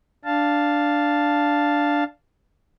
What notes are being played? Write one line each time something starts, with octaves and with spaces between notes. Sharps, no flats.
D4 F5 A5